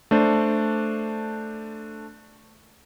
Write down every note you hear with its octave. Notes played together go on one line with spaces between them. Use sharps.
A3 D4 C5